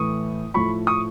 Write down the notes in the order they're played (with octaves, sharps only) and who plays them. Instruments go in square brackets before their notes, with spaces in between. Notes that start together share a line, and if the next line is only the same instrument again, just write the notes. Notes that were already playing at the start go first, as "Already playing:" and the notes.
Already playing: [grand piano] A2 E3 C#6 D#6
A2 F3 B5 C#6
C#6 D#6